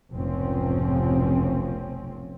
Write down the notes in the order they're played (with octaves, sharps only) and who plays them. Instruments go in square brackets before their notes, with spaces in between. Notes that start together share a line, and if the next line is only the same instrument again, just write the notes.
[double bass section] F1 B1 G#2 F3 C4 C#4